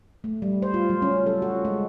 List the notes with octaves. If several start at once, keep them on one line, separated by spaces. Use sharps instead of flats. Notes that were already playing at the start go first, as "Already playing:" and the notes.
A3
G3
C5
F4
F#3
C#4
A4
F#4
G#3